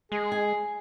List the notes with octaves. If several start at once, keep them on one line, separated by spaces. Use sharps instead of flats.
G#3 G#4
G#5